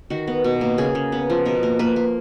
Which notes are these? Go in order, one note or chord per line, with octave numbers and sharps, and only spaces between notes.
D#3 F#4
B3
B2
A#3
C#3 G#4
C#3
B3
F3
B2 A#4
A#3
A#3 B4
A#3